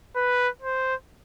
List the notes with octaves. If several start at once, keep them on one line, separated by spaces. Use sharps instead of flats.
B4
C5